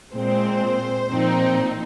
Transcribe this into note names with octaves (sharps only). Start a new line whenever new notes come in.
A#2 G#3 C4 C5
A#2 F3 C4 D#4